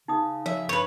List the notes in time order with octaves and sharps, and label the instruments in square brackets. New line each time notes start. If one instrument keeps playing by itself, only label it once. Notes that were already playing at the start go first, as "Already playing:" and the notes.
[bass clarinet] C#3 [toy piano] D#4 D#6
[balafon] F3 [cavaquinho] E5
[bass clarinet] G2 [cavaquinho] B4 C#5